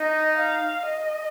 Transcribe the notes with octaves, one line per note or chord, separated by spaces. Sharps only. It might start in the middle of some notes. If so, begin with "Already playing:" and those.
Already playing: D#4 D#5
F5
D#5